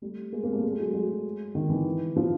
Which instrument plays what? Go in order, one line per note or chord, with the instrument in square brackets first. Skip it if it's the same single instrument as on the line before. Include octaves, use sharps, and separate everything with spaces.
[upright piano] G3 A3
G#3 A#3
A#3 C4
G3 A3
G#3
A3
F#3 G#3
F#3 G#3
D#3
E3
F3